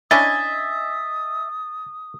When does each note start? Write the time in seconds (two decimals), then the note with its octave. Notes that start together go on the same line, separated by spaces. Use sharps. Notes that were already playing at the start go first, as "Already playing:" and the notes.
0.11 C#4 D4 E4 D#5 E5 G#5 D#6 A6